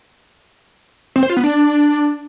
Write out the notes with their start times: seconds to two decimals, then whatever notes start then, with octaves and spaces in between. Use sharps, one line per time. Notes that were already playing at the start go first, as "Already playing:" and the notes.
1.16 C4
1.23 C5
1.30 F4
1.37 B3
1.44 D4